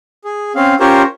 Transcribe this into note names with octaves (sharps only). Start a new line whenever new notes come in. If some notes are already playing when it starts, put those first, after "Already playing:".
G#4
C4 C#4 F5
C#4 F4 G4 A#4 C5 C#5